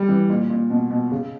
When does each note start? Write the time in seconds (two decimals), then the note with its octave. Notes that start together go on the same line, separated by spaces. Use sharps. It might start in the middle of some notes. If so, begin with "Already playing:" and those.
Already playing: G3
0.09 E3
0.30 A#2
0.50 A#2
0.70 B2
0.91 B2
1.12 C#3